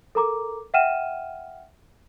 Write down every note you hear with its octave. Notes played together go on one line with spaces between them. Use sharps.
A4 A#4 A#5 D6
E5 F#5 G5 F6 D#7 E7